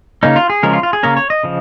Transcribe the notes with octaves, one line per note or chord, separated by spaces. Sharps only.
C#3 A#3 C#4 D#4
F4
G#4
C#3 F3 G#3 C#4 A#4
F4
F4
G#4
C#3 A#3 C#4 A#4
C#5
D#5
C#3 F3